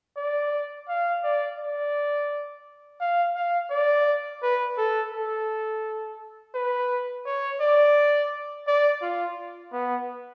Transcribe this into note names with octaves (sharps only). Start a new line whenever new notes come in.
D5
F5
D5
D5
F5
F5
D5
B4
A4
A4
B4
C#5
D5
D5
F4
B3